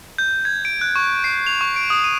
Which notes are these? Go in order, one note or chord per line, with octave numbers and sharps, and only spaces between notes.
G6
G#6
D7
F#6
C#6
C7
F7
C#6
D7
D#6
D#7